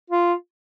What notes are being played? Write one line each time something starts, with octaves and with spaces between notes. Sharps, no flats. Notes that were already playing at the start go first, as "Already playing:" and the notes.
F4